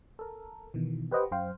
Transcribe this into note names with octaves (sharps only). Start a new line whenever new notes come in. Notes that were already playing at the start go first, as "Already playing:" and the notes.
A4 A#4
B2 D#3 E3
G4 B4 C5 D#5 F#5 G5
F#2 C5 F5 G5